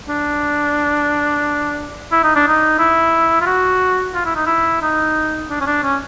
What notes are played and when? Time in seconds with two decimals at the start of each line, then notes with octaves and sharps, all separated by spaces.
0.09 D4
2.12 E4
2.24 D#4
2.36 D4
2.48 D#4
2.79 E4
3.41 F4
3.47 F#4
4.14 F4
4.25 E4
4.36 D#4
4.47 E4
4.82 D#4
5.50 D4
5.61 C#4
5.67 D4
5.83 C#4